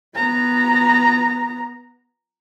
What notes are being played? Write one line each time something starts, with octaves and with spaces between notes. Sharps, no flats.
B3 A#5